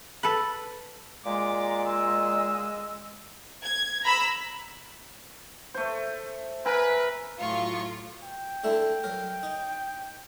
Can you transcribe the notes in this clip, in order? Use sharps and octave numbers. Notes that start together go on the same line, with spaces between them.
A4 B4
A#2 G#3 A#5 D6
D#5 E6
G#6
A#5 B5 E6
A3 C5
A#4 B4 E5 G#5
A2 F#3 F4 C#6
G5
D3 A3 E4
F#3 A#4
D#4